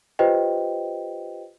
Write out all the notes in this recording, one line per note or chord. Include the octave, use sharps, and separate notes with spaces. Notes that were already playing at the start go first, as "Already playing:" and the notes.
F4 G4 B4 C5 D#5 G5